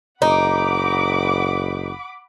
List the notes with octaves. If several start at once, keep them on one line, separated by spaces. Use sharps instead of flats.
F#1 D#4 F#5 B5 D6